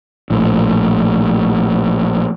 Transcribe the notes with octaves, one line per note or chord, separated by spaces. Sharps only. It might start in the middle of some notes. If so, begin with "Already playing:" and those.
A#1 A2